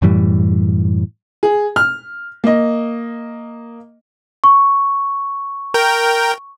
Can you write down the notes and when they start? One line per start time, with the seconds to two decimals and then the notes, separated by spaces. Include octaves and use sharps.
0.02 F#2 A2 E3 G3
1.43 G#4
1.76 F6
2.44 A#3 D#5
4.44 C#6
5.74 A#4 G5